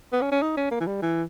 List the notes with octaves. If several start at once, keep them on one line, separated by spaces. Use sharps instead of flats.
B3
C#4
C#4
D#4
C#4
A#3
E3
G3
E3